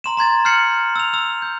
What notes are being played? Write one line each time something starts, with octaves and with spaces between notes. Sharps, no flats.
A#5 C6 E7
A#5 C6 G#6 A6
F6 G6 A6 C7 C#7 F#7
E6 F7
E6 F7
G6